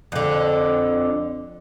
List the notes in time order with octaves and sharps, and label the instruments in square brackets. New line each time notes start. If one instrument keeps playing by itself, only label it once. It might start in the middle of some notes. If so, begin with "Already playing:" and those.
[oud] F2 D3